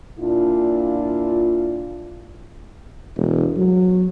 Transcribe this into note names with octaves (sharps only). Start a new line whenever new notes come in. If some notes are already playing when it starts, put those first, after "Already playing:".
A#2 D4 E4 F4
E1
F#3